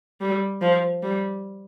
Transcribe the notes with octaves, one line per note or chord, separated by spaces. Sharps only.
G3
F3
G3